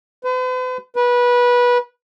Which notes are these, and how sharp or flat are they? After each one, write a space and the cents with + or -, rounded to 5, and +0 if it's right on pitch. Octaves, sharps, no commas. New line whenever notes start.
B4 +45
B4 -20